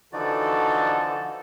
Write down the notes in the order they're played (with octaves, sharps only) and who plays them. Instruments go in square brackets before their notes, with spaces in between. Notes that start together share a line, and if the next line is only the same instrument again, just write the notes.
[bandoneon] D3 E3 F3 [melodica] D#4 F#4 D5 [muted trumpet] A4